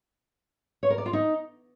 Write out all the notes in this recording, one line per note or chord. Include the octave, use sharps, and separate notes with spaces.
C#5
A#4
D5
F4
D#4